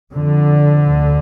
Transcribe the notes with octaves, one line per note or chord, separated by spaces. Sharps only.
F2 D3
D2